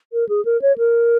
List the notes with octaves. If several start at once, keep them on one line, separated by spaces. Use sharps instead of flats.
A#4
G#4
A#4
C#5
A#4